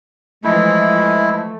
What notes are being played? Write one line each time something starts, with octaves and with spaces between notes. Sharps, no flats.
E3 F3 G#3 A3 E4